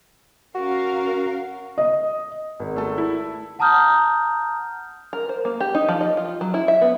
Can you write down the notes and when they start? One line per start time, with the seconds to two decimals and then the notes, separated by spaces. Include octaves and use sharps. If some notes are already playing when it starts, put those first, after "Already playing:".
0.55 C#4 F#4 A#4 F5
1.78 D#5
2.60 G#1
2.76 A3 A4
2.98 E4
3.59 F#5 A5 A#5 D#6 F6 G6
5.13 A#4
5.29 C5
5.45 A#3
5.60 G4
5.75 D#4
5.89 F3
6.01 D#5
6.17 F4
6.41 F#3
6.54 E4
6.68 E5
6.81 B3